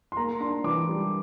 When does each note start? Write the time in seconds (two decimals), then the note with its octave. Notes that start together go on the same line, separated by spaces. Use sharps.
0.12 C6
0.17 A#3 A#5
0.40 D4 C6
0.64 E3 D6
0.89 G3